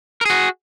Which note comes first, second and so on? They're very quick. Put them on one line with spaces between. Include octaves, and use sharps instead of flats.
A#4 G#4 F#4